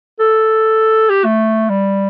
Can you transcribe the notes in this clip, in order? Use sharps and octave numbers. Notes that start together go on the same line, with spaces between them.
A4
G4
A3
G3